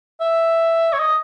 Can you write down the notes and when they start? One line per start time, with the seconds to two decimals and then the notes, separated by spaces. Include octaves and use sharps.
0.21 E5
0.93 C#5
0.99 D#5